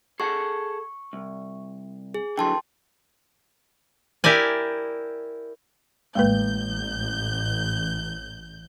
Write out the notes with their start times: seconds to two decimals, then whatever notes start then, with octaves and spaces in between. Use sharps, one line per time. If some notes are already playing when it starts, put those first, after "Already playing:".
0.20 G#4 A4 F#5 C#6
1.13 C2
2.14 G#4
2.38 D3 E3 F#3 G5 A5 C6
4.24 E4 G4 A#4 D5 G#5
6.15 A1 G#3 A#3 B4 G6